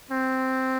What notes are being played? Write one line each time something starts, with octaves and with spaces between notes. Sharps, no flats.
C4